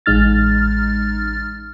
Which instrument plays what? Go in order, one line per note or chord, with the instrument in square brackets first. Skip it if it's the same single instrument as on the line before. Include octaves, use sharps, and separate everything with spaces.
[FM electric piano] A1 G#3 D#4 F6 A6